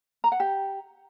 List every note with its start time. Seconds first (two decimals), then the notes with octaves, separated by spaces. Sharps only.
0.24 A#5
0.32 F#5
0.40 G4